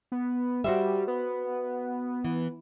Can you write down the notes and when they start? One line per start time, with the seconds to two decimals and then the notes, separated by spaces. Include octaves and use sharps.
0.12 B3
0.64 G3 F#4 C5 E5
1.08 B3
2.24 E3